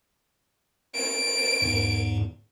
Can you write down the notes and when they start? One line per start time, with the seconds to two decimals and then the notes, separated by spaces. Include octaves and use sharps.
0.95 D7
1.62 E2 G#2